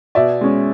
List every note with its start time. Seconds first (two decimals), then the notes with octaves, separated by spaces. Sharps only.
0.15 B2 D5 E5
0.41 G#3 C#4